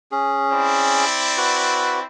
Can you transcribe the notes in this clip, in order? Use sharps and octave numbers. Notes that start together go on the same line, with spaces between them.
C#4 G#4
C4 E4 D5
F#4 B4